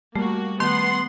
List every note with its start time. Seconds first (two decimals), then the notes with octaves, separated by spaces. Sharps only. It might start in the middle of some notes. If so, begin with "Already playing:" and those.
0.16 G3 A3 A#3 F#4
0.60 D#3 A3 B3 F#5 C6